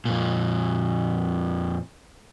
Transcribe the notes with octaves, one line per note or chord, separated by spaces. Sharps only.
F2 A#2